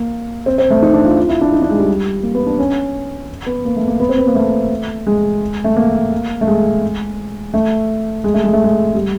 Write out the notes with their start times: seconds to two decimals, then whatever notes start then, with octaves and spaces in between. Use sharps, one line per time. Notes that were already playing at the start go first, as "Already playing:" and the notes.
Already playing: A#3
0.46 C4
0.58 C4
0.70 A3
0.83 D#4
0.94 D4
1.05 F4
1.17 F4
1.29 E4
1.41 D4
1.53 D#4
1.62 D4
1.70 G#3
1.79 G3
2.23 A#3
2.35 B3
2.47 D4
2.59 C#4
3.46 B3
3.65 A#3
3.76 A3
3.88 A#3
4.00 B3
4.09 C4
4.18 B3
4.27 A#3
4.35 A3
5.07 G#3
5.64 A3
5.77 A#3
6.41 A3
6.47 G#3
7.54 A3
8.24 G#3
8.34 A3
8.44 G#3
8.53 A3
8.64 G#3
8.95 G3